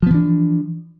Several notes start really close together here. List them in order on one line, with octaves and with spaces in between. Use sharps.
F3 B3 E3 D4